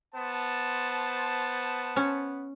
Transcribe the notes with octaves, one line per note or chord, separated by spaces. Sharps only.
B3 C5 A5
C#4